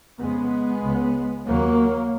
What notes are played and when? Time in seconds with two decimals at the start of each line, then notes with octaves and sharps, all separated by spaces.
0.20 F2 C#3 G#3 B3
0.83 C#2 C#3
1.46 D#2 C#3 F#3 A#3